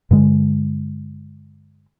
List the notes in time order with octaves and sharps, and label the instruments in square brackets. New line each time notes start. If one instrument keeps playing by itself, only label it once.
[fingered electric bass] G2 D3 G#3